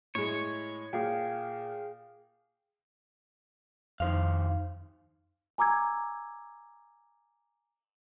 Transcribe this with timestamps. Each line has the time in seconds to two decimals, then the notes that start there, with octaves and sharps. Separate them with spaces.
0.15 A2 G#3 C#5
0.93 A#2 G#4 F5 G5
4.00 F2 D#3 C5 F5
5.58 G#5 A#5 D6 E6 G#6